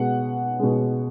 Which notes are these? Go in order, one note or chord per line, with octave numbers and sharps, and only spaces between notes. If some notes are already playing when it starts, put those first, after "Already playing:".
Already playing: B2 G#3 F#5
B2 G#3